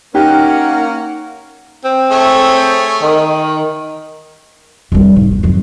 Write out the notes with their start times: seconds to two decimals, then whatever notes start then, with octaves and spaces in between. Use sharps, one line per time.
0.15 A#3 C#4 D#4 G4 F#5
1.85 C4
2.11 A3 G#4 C#5
3.02 D#3
4.92 F2 G3
5.16 G#2
5.31 B3
5.43 F2 F#3